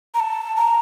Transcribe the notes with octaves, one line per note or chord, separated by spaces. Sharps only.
A#5
A5
A#5